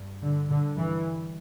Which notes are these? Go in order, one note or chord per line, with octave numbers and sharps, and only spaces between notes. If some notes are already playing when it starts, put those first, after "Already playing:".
Already playing: G2
D3
G2 D3
E3